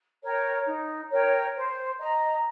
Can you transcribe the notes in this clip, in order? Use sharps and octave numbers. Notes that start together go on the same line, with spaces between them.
A#4 C#5 G5
D#4
A#4 C#5 G5
C5
D#5 A#5